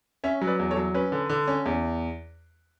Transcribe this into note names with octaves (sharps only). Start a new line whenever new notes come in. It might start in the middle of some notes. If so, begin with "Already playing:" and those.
C#4 C#5 E5
F#3
B4 D5
E2
A4 C#5
F#3
C#4 B4
D3
D3
C#4
E2